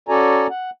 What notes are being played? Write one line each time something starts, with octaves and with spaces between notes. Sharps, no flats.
C#4 F#4 A4 D5 G#5 A#5
F#5